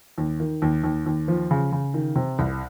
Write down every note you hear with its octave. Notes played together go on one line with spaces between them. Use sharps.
D#2
D#3
D#2
D#2
D#2
F3
C#3
C#3
D#3
C3
C2